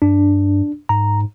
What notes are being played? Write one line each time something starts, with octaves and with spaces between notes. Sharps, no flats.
G2 D4
G#2 A#5